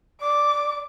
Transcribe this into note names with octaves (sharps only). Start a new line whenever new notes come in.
D5 D6